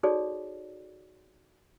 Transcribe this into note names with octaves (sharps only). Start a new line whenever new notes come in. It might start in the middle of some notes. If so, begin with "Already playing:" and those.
D#4 F#4 G#4 A4 C#5 D5